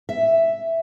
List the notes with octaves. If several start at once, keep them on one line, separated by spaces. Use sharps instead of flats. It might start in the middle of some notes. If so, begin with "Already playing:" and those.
E5